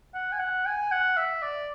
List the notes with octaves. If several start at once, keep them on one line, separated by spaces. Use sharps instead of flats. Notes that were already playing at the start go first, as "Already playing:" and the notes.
F#5
G#5
F#5
G#5
F#5
E5
D5